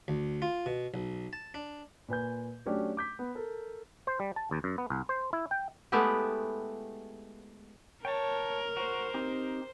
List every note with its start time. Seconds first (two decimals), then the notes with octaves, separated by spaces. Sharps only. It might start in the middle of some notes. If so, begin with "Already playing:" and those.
0.08 D2
0.42 F4
0.66 B2
0.94 B1
1.33 A5
1.54 D4
2.08 A#2 B4 G#5 G6
2.66 F#3 A3 C#4 D4 G4
2.97 D6 G6 B6
3.19 B3
3.35 A4 A#4
4.07 C5
4.20 G3
4.36 A5
4.51 D#2
4.64 F#2
4.78 B3
4.90 C2
5.09 C5
5.33 E4
5.51 G5
5.92 G#3 A3 B3 E4 G4
8.05 A#4 C#5 G5 A5
8.77 F#4 C5
9.14 C4 D#4 G4